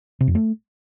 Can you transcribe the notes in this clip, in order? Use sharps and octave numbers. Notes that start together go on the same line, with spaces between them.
C3
F2
A3